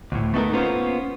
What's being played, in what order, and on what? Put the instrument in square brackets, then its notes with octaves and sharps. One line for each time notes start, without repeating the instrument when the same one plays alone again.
[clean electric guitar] D2 A2
A3 B3 D#4 F#4 A4 A#4
A#3 B3 C#4 F4 C5